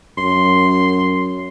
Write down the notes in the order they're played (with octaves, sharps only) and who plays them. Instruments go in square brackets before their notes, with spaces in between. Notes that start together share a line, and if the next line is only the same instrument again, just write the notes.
[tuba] F#2 [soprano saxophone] C6